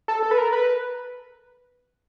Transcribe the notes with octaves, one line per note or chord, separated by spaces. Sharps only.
A4
A4
B4
A#4
B4